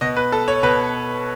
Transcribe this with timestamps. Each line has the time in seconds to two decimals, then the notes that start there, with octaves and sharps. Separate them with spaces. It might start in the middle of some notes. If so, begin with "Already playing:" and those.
0.01 B2 D#5
0.16 B4
0.32 A4
0.48 C#5
0.63 B2 B4